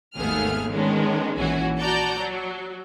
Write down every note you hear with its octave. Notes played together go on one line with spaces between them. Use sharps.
G#1 D#2 A3 B3 G#4 F6
D#3 G#3 B3 C#4 D4
A#1 E3 C#4 F#4 G#5
F#4 D5 A5 A#5 G6
F#3